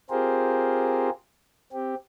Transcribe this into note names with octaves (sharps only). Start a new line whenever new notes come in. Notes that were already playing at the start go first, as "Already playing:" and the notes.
C4 F4 G4 G#4 A#4 C5
C4 G4